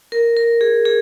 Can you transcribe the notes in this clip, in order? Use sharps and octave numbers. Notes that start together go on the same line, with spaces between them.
A#4
A#4
G#4
G#4